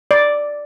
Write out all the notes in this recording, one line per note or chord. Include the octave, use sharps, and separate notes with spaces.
D5